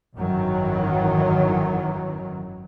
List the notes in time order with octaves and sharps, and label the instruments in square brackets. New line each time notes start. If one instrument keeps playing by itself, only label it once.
[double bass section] G#1 F#2 D#3 E3 F#3